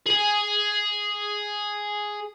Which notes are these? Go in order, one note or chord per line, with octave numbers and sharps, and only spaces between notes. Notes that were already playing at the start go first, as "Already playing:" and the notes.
G#4 G#5